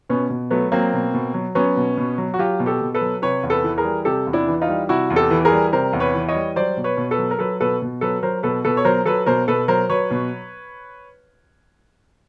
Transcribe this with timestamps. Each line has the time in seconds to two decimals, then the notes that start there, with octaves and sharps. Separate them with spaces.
0.10 B2 B3 C#4
0.30 B2
0.51 F#3 A3 B3
0.72 F#3 A#3 C4
0.93 B2
1.14 B2
1.34 F#3
1.55 F#3 B3 C#4
1.77 B2
1.97 B2
2.18 F#3
2.34 F#4
2.39 F#3 F4 G4
2.60 B2
2.66 G4 A4
2.81 B2
2.94 A4 B4
3.01 F#3
3.22 C3 B4 C#5
3.43 E2
3.50 A4 B4
3.64 E3
3.78 G#4 A#4
3.85 G3
4.05 C3 G4 A4
4.27 E2
4.33 D4 E4
4.48 E3
4.61 D#4 F4
4.69 G3
4.89 C3 E4 F#4
5.10 E2
5.16 G4 A4
5.31 E3
5.45 G#4 A#4
5.52 G3
5.73 C3 A#4 C5
5.93 E2
6.00 B4 C#5
6.14 E3
6.28 C#5 D#5
6.35 G3
6.56 F#3 C5 D5
6.77 B2
6.84 B4 C#5
6.97 B2
7.11 A4 B4
7.18 F#3
7.31 A#4
7.39 F#3 A4 B4
7.61 B2 A4 B4
7.82 B2
8.01 F#3 A4 B4
8.23 F#3 A#4 C5
8.43 B2 A4 B4
8.64 B2 A4 B4
8.77 C#5
8.85 F#3 A#4 C5
9.06 F#3 A4 B4
9.26 B2 A#4 C5
9.48 B2 A4 B4
9.68 F#3 A#4 C5
9.89 F#3 B4 C#5
10.11 B2